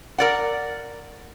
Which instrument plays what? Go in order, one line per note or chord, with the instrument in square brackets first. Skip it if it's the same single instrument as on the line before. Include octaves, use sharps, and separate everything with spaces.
[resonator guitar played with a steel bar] A#4 D5 F#5